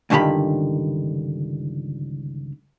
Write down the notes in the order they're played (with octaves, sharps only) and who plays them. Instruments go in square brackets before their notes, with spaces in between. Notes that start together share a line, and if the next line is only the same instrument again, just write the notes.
[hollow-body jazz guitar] C#2 G2 D3 D#3 G4 B5